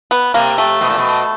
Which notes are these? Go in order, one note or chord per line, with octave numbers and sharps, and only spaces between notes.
B3
C3 A#3
A3
B2
A#2
B2